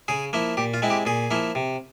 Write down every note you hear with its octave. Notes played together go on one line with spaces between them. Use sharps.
C#3 G#4
F3 A#3 E4
A#2 G4
F4
G#3 C4 E4
G4
A#2 G#4
F3 A#3 E4
C3